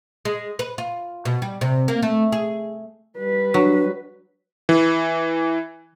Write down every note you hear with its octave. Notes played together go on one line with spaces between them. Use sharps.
G#3
B4
F4
B2
G3
C3
A#3
A3
G#4
G3 B4
F#3 D4
E3